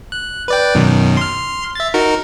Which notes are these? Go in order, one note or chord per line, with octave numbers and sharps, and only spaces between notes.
F#6
B4 D5 G5
F#2 B2 D#3
C6 F6
E5 A6
D#4 F#4 A#4